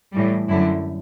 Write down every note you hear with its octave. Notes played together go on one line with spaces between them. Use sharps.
A2 E3 G3
F#2 D3 G3 E4